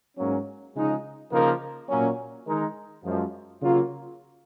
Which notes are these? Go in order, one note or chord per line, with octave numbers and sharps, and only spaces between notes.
G#2 F#3 A#3 C#4
C#3 F3 G#3 D#4
C#3 F3 A#3 D#4 A#4
A#2 F#3 A#3 C#4
D#3 G#3 D#4 A#4
F#2 F3 G#3
C#3 F#3 A#3 F4